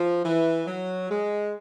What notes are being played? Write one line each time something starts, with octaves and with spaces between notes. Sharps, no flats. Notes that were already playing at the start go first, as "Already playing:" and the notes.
Already playing: F3
E3
F#3
G#3